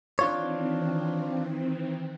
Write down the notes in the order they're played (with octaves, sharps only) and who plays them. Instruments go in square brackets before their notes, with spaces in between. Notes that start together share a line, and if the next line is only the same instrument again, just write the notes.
[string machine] D#3 E3 C4 [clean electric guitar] D4 F4 C#5